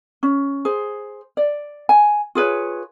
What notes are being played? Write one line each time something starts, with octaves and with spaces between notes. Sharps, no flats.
C#4
G#4 C5
D5
G#5
F4 G#4 B4 C#5